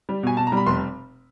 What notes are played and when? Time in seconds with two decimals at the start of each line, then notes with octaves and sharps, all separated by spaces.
0.09 G3
0.23 B2 G#5
0.37 B2 A5
0.47 A#5
0.52 G3
0.57 B5
0.66 F1 C6